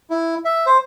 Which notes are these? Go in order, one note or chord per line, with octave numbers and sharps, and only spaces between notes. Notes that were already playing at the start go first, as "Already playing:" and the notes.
E4
E5
C5